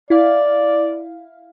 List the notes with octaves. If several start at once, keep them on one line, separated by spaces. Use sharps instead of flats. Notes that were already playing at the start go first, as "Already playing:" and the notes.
E4 D5 F5